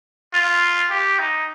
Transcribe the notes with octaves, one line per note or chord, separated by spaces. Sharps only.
F4
G4
D#4